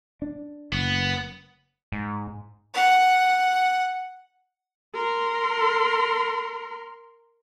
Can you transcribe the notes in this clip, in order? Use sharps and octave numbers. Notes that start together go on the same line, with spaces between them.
D4
F#1 B3
G#2
F#5
A#4 C6